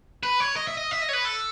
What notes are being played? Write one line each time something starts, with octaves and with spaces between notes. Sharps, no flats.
B4
C#5
D#5
E5
D#5
E5
D#5
C#5
B4
A4